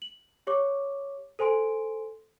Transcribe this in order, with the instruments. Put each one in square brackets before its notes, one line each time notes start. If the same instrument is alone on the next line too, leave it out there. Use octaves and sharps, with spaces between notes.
[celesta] F#7
G4 C#5 C#6 D6
A4 C5 G#5 C6 D7